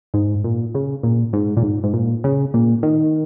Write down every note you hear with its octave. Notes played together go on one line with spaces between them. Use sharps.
G#2
A#2
C#3
A#2
G#2
A#2
G#2
G#2
A#2
C#3
A#2
D#3